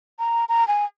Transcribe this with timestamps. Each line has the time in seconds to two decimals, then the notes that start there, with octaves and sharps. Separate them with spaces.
0.19 A#5
0.49 A#5
0.68 G#5